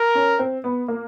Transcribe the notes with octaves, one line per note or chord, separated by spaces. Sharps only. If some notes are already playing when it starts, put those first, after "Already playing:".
Already playing: A#4
C#4
C4
B3
A#3